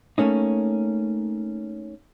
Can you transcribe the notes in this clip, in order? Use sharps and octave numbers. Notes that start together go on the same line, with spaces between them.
A3 A#3 C#4 D#4